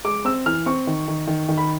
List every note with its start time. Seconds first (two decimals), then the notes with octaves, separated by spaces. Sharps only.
0.04 G#3 D6
0.25 C4 E6
0.46 E3 F6
0.66 C4 C#6
0.87 D#3
1.08 D#3
1.27 D#3
1.49 D#3
1.57 B5